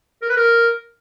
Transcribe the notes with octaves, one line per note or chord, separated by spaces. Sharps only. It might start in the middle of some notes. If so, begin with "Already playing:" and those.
A#4
B4
A#4